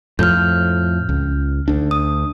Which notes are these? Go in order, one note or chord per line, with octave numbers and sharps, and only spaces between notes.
F2 A2 F3 F6 G6
C#2
D2 D4
D#6